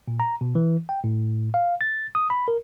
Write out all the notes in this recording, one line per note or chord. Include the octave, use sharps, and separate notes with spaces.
A#2
A#5
B2
E3
G5
A2
F5
A6
D#6
B5
A#4